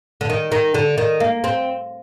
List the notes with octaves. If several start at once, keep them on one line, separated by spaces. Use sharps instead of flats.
D3
D#3
D#3
D3
D#3
A#3
C4